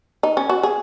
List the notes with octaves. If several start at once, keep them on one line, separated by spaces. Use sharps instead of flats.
D#4
C#4
F#4
G#4